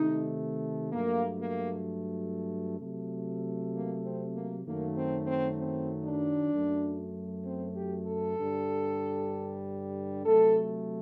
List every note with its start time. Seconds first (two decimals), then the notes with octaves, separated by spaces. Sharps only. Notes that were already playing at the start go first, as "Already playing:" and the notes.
Already playing: C3 D#3 A3 D#4
0.92 G2 F#3 A3 A#3
1.39 A#3
2.79 C3 F#3 A3
3.72 A#3
4.03 C4
4.35 A#3
4.65 F#2 D#3 F#3 A3 A#3
4.96 C4
5.27 C4
5.59 C4
6.05 D4
6.52 F#2 F#3 A3
7.45 C4
7.76 G4
8.07 A4
8.39 G2 D3 G3
10.25 C3 F#3 A3 A4